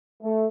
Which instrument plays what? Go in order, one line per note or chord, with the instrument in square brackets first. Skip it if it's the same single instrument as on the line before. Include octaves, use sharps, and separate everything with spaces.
[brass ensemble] A3